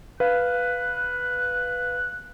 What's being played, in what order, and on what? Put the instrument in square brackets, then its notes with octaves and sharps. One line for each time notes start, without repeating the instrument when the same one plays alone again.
[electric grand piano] B4 F5 [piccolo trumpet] F#6